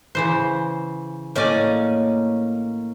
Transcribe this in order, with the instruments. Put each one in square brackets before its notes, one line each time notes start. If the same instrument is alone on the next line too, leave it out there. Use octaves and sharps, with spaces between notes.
[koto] C#3 E3 C5
[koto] A2 D5 G#5 [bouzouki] A#3 C#4 D#5